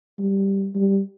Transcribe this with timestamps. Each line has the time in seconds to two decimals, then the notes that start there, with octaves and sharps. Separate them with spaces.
0.19 G3
0.75 G3